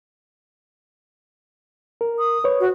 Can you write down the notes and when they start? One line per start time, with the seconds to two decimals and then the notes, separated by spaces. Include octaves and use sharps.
2.01 A#4
2.19 D#6
2.44 B4 C#5
2.60 F#4